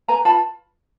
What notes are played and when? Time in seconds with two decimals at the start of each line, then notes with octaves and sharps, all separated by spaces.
0.08 B4 G#5 A#5
0.25 F4 A5 B5